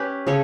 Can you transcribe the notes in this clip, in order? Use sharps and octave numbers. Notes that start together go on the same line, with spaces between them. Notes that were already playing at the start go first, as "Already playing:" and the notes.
Already playing: C#4 G4 B4
C#3 A4 C#5